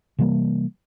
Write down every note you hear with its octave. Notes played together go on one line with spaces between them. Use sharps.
C3 E3 G3 A#3